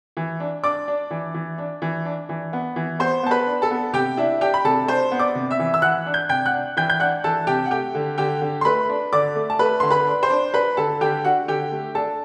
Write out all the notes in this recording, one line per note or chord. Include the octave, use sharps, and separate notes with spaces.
E3
D4
D4 D5 D6
D4
E3
E3
D4
E3
D4
E3
B3
E3
B3 C5 C6
B3 A5
B4 B5
D4
A4 A5
B3
C3 G4 G5
D4 E4 E5
D4 G4 G5
B5
C3 A4 A5
D4 C5 C6
B3
D5 D6
C3
E5 E6
E3
E6
E3 F#5 F#6
D4
G6
C3 G5 G6
F#5 F#6
D4
E3 G5 G6
G6
D4 F#5 F#6
E3 A4 A5
C3 G4 G5
F#5
A3 G4 G5
D3
D3 G4 G5
D3
C6
A3 B4 B5
D4
D3 D5 D6
A3
A5
A3 B4 B5
D3 C6
B4 B5
D4
C5 C6
D4
D4 B4 B5
D3 A4 A5
D3 G4 G5
D4 F#4 F#5
D3 G4 G5
A3
D4 A4 A5